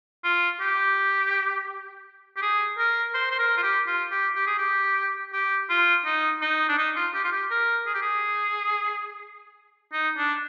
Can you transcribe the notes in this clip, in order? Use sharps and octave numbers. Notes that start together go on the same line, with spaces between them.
F4
G4
G4
G#4
A#4
C5
C5
A#4
F4
G4
F4
G4
G4
G#4
G4
G4
F4
D#4
D#4
D4
D#4
F4
G4
F4
G4
A#4
G#4
G4
G#4
D#4
D4